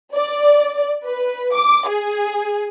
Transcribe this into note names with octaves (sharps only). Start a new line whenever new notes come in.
D5
B4
D6
G#4